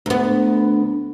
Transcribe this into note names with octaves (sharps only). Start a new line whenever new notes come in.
D2 B3